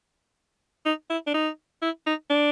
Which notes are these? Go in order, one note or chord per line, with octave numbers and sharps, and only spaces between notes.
D#4
E4
D4
D#4
E4
D#4
D4